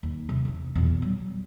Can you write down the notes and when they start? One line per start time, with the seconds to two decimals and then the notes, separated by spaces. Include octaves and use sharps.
0.03 D#2
0.29 C3 F3
0.45 E2 D4
0.75 E2 A#2
1.02 F#3 G3